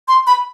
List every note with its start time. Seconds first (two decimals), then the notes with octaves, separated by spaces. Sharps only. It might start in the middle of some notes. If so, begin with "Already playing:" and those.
0.08 C6
0.27 B5